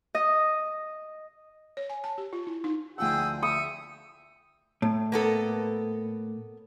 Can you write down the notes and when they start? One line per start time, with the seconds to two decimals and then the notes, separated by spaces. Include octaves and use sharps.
0.15 D#5
1.77 C#5
1.90 G#5
2.04 A5
2.18 G4
2.33 F4
2.47 E4
2.64 D#4
2.98 D2 F3 G#4 F#5 G5 E6
3.43 E5 D#6 C#7
4.82 A2
5.12 A#3 B3 A4